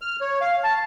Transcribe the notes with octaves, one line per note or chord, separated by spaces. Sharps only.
F6
C#5
F5
A5